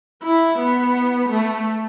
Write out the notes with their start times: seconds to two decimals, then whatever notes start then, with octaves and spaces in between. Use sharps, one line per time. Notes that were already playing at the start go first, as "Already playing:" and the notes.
0.23 E4
0.58 B3
1.29 A3